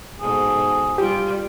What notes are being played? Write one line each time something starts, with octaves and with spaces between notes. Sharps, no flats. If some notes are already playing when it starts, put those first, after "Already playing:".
G#2 B2 G#4 A4
G3 F4 G4